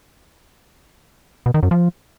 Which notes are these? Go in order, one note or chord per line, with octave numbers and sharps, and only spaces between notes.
B2
D#3
F#2
F3